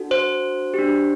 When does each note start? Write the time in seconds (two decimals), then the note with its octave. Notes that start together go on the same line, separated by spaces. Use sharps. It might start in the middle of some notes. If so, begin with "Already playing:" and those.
Already playing: D4 F#4 A4
0.11 C5
0.74 D4 G4